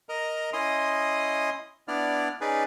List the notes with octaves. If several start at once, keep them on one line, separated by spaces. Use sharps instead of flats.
A#4 D#5 A#5
C#4 E4 D#5 C6 D#6
B3 D4 E4 D5 F6
C#4 D#4 G#4 B4 D5